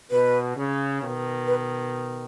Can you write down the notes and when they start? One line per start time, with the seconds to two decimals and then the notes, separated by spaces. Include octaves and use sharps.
0.11 B2 B4
0.57 C#3
1.01 B2 D#3
1.47 B4